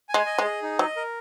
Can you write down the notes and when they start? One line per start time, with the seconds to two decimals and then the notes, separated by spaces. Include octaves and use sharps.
0.09 G#5
0.14 G#3
0.26 D#5
0.38 G#3
0.44 G#4
0.62 D#4
0.79 F#3 D#5
0.96 A#4